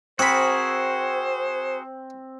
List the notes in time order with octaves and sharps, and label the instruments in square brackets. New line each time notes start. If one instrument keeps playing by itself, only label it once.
[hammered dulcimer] C4 [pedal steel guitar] F#4 G#4 A#4 [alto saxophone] C5 [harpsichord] F#5 B5